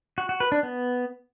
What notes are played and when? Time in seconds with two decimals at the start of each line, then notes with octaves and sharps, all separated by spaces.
0.18 F#4
0.29 F#4
0.40 B4
0.52 D4
0.63 B3